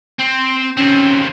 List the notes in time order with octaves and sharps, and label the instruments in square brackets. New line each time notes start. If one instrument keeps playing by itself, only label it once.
[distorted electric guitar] C4
[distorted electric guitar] D#2 C4 [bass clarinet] C#4